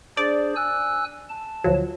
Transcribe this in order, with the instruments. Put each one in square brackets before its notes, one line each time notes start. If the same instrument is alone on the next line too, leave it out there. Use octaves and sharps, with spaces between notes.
[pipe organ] D4 G#4 C5 [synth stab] D5
[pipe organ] G#5 E6 F#6
A5
[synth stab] D2 F3 F#3